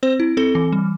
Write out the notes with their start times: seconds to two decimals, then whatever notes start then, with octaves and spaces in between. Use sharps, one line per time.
0.03 C4 C5
0.20 E4
0.37 C4 A4
0.55 E3
0.72 G3